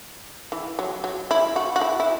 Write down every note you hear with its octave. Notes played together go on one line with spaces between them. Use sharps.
E3
F#3
F#3
E4
F#4
F#4
E4
E4